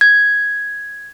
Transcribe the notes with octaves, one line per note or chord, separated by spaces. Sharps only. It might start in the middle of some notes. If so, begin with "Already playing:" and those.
G#6